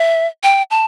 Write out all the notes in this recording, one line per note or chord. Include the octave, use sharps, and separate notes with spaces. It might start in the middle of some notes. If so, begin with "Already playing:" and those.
Already playing: E5
G5
A5